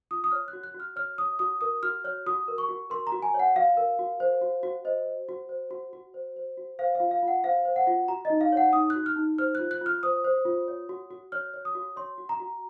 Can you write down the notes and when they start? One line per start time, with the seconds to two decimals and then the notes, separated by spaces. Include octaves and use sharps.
0.11 F4 D#6
0.24 D#6
0.31 C#5 F6
0.48 F#6
0.53 F#4
0.64 F#6
0.74 F#4
0.80 F6
0.96 C#5 F6
1.18 C#5 D#6
1.39 F#4 D#6
1.61 A#4 D#6
1.83 F#4 F6
2.04 C#5 F6
2.27 F#4 D#6
2.48 A#4
2.58 C#6
2.69 F#4
2.90 A#4 C6
3.07 A#5
3.12 F#4
3.22 G#5
3.34 C#5
3.40 F#5
3.55 F#4 F5
3.77 A#4
3.99 F#4
4.20 C5
4.42 F#4
4.63 F#4
4.85 C5 D#5
5.06 C5
5.29 F#4
5.49 C5
5.71 F#4
5.93 F#4
6.14 C5
6.36 C5
6.57 F#4
6.79 C5 F5
6.95 F4 F5
7.11 F5
7.23 F4 F#5
7.44 C5 F5
7.65 C5
7.76 F#5
7.87 F4
8.08 F#4 A#5
8.25 D#4 D#5
8.41 F5
8.52 C#5 F#5
8.73 D#4 D#6
8.90 F#6
8.96 F#4
9.06 F6
9.16 D#4
9.38 C5 F6
9.55 F4 F#6
9.71 F#6
9.81 F4 F6
10.03 C5 D#6
10.24 C5
10.45 F4
10.68 C#5
10.89 F#4
11.11 F#4
11.32 C#5 F6
11.54 C#5
11.65 D#6
11.75 F#4
11.96 C#5 C6
12.18 F#4
12.29 A#5
12.40 F#4